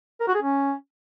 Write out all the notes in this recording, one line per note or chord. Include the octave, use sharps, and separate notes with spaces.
A#4
F#4
G#4
C#4